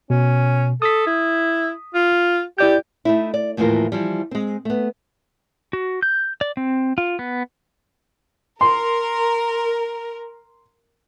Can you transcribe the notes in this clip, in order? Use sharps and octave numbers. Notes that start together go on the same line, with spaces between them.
B2 C#4
A4 D#6 B6
E4
F4
E4 G4 D5 G6
A3 D#4 E4
D5
D#2 A2 E3 F3 F4 A#4
E3 F3 G3
G#3 C4
A3 B3
F#4
G6
D5
C4
F4
B3
A#4 C6